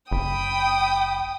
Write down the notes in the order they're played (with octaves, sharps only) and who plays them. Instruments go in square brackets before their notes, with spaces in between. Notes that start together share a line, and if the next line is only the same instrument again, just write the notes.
[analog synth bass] F#1 [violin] G5 D#6 [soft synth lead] B5